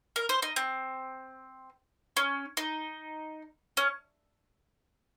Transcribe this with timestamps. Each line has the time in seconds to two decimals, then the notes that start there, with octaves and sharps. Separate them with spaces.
0.16 A#4
0.29 C5
0.42 D#4
0.56 C4
2.17 C#4
2.57 D#4
3.77 C#4